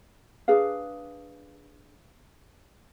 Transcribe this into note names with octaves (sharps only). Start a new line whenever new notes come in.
D4 G#4 B4 F5